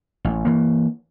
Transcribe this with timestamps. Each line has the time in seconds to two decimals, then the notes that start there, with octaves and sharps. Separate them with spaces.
0.25 A1
0.45 E3 A#3